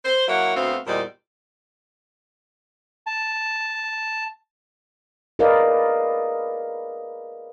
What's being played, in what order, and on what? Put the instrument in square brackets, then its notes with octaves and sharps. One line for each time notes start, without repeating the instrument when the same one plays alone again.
[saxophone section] C5
F#3 A#3 E4 C#5 F#5
D2 A3 B3 C4 F#4 F5
E2 A#2 G3 G#3 C5 D5
[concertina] A5
[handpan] G#4 A#4 B4 D5 D#5 F5